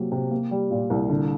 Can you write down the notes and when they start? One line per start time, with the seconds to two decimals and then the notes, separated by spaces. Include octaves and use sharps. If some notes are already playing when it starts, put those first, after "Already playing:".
Already playing: C3 F#3 A#3
0.12 C3
0.31 A#3
0.51 G3
0.71 A#2
0.90 C2
1.09 D3